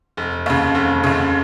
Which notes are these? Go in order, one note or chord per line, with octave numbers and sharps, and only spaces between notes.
F1
D#2 C#3
F1
D#2 C#3